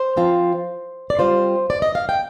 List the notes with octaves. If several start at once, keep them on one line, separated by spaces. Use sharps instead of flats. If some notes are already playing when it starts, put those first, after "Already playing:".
Already playing: C5
F3 C4 F4
D5
G3 C4 F4 C5
D5
D#5
F5
G5